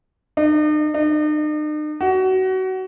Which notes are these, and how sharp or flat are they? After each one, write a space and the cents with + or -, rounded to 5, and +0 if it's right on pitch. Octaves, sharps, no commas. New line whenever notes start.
D#4 -45
D#4 -45
F#4 +25